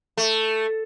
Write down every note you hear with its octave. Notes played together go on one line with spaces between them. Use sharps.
A3